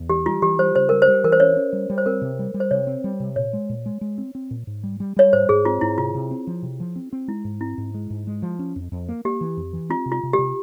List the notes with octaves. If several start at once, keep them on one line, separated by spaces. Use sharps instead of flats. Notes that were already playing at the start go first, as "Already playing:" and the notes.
Already playing: E2
E3 G4
G3 F4
E3 G4
G3 C5
C#3 C5
G3 A#4
C5
G3
E3 A#4
C5
C#4 C#5
C#4
G3
G3
C5
C4 A#4
C3
G3
G3
C5
C3 C#5
C4
G3
C3
A#2 C#5
G#3
A#2
G#3
G#3
C4
C4
A#2
G#2
G3
G3
G3 C#5
G#2 C5
G#2 G#4
C4 F4
G#2 E4
C3 F4
C3
C4
F3
C3
F3
C4
C4
G#3 E4
G#2
C4 E4
G#2
G#3
G#2
G#3
F3
C#4
F2
F2
A#3
A#3 G4
E3
F2
E3
C4 F4
C3
F4
C3
C3 G4